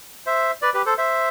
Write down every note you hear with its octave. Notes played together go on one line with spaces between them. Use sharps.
C5 E5
B4 D5
G4 B4
A4 C5
C5 E5